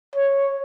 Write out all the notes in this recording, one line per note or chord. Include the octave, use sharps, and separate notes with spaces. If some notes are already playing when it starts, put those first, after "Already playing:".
C#5